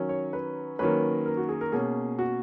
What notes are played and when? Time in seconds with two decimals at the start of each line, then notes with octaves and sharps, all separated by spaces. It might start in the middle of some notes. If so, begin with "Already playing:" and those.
Already playing: D#3 F#3 C#4
0.09 C#5
0.33 B4
0.79 D#3 F#3 A#3 C#4 B4
1.26 A#4
1.37 F#4
1.49 G#4
1.61 A#4
1.72 B2 A#3 C#4 G#4
2.19 F#4